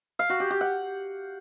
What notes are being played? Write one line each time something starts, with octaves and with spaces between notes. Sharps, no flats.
F5
F#4
G4
G4
F#5